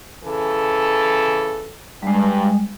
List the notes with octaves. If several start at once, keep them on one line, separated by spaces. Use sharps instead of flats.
C#3 E3 A4
G2 G3 G#3